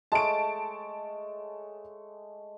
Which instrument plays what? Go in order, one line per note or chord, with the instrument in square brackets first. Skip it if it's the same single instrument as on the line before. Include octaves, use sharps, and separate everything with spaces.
[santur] G#3 A3 C#5 [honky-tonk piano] A5 D7